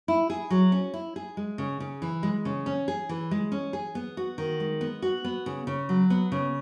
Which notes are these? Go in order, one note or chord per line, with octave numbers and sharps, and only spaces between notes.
E4
G#4
F#3
C#4
E4
G#4
G#3
C#3
C#3
E3
G#3
C#3
C#4
G#4
E3
G#3
C#4
G#4
B3
F#4
D#3
G#3
B3
F#4
B3
C#3
C#3
F#3
B3
C#3